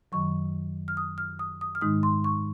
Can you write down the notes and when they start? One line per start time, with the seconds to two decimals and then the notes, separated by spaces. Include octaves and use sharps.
0.12 F#2 D#3 F#3 C#6
0.88 F6
0.97 D#6
1.18 F6
1.39 D#6
1.61 D#6
1.75 F6
1.81 G#2 D#3 G#3 D#4 D#6
2.03 C6
2.24 C#6